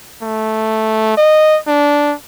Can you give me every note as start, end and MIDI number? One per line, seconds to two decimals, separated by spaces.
0.23 1.14 57
1.18 1.58 75
1.68 2.14 62